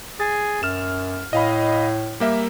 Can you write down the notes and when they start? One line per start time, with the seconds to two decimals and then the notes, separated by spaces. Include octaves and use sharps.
0.20 G#4 A6
0.63 F#2 F6 E7
1.33 A2 D#5 F5 B5
2.20 G3 A#3 E5